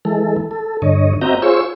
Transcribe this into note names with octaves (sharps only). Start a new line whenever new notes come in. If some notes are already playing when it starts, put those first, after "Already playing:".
E3 G#3 A4
A4
G2 D3 C#5 D#5
C4 F#4 D#5 E5 A#5 G6
F4 G#4 C5 C#5 C#6 E6